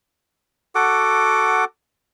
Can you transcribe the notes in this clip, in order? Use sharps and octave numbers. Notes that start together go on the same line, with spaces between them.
F#4 A4 F#5 D6